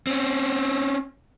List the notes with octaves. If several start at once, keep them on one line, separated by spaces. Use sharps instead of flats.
C4 C#4